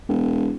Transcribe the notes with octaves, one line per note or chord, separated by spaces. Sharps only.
E1